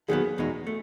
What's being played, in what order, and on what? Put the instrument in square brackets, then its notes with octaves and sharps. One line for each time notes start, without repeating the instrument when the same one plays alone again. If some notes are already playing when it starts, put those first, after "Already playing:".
[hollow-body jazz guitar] D#2 D#3 F#3 B3 [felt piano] G#4
[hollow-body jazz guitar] E2 B2 G#3 D#4
A3